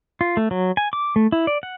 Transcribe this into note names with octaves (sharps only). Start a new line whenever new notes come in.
F4
A3
F#3
G#5
D6
A3
E4
D5
F#5